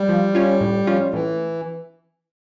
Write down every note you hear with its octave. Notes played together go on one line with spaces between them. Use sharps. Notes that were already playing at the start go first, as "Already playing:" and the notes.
Already playing: G3
F3
C#4 F4
A2
F3 C#4 F4
A2 E3